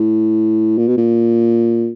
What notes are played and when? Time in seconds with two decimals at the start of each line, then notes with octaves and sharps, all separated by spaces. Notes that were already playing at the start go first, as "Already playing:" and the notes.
Already playing: A2
0.78 A#2
0.88 B2
0.97 A#2